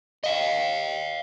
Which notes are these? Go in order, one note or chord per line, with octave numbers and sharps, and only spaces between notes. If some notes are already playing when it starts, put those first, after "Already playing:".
D#5 F5